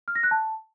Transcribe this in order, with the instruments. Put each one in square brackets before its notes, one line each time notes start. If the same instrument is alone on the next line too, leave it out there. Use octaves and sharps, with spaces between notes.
[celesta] F6
A#6
F#6
A5